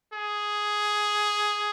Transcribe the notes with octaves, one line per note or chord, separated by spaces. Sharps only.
G#4